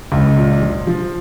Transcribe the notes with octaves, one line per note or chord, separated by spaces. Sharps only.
C#2
A#2
F3
F3